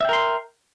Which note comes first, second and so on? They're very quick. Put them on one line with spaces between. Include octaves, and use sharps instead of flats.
E5 G5 A#4 C6